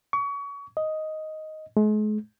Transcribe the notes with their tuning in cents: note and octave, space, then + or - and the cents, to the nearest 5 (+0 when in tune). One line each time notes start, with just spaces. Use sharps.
C#6 +30
D#5 +5
G#3 +40